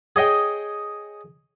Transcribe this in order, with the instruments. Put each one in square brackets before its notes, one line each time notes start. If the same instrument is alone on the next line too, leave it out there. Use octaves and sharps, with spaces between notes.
[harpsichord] G#4 C#5 D#5 G5